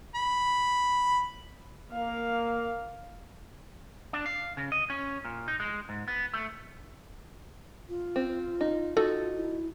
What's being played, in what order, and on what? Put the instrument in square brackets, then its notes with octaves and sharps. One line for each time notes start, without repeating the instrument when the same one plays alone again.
[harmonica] B5
[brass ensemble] A#3 [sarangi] F5
[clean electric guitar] D4
F5
C#3
D#5
C#4
A#2
D#4
G#3
G#2
B3
A3
[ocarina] F4
[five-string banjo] C4
D#4
[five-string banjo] D#4 F#4 [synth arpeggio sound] A4
[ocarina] E4